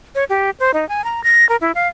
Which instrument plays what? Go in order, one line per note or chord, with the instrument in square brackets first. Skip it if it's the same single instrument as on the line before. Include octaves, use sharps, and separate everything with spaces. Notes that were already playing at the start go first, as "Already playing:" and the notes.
[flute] C#5
G4
C5
D#4
G#5
A#5
A#6
A#4
E4
F5